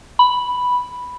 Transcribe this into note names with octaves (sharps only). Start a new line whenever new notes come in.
B5